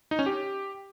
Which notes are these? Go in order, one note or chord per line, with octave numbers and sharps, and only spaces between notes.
D#4
C#4
G4